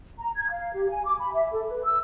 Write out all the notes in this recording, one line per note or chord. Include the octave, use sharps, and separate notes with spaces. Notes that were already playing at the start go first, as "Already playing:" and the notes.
A#5
G#6
F5
G4
G#5
D6
B5
E5
A4
B4
E6